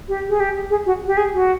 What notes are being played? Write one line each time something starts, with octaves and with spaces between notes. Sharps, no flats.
G4
G#4
G4
G#4
F#4
G4
G#4
F#4